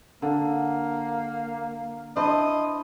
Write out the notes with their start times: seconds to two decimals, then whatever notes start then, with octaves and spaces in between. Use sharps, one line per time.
0.22 D3 A#3
2.16 D4 E4 C5 D#5